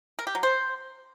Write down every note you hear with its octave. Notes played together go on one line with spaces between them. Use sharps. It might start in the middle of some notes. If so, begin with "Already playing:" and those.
A#4
G4
F#3
C5